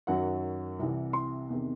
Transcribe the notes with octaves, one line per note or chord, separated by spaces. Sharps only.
F#2 D#3 F#3 F#5
C2 C3 E3
C6
E2 C3 D#3